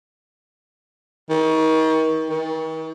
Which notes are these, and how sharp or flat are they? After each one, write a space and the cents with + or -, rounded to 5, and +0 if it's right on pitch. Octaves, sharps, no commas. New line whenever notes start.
D#3 +35
D#3 +45